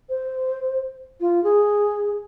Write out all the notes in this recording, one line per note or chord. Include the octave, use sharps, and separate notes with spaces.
C5
F4
G#4